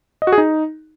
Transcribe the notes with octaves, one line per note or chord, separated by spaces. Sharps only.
D#5
F#4
G#4
D#4